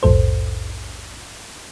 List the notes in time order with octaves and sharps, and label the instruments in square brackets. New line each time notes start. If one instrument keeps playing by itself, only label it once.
[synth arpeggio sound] A#1 E2 G#2 A4 C5